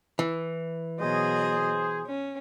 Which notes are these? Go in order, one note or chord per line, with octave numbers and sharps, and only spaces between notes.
E3
B2 F#3 G#4 C5 D#5
C#4